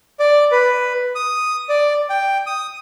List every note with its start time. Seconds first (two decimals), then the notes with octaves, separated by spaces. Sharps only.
0.19 D5
0.51 B4
1.15 D#6
1.69 D5
2.10 G5
2.46 D#6